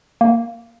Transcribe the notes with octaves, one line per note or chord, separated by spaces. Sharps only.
A#3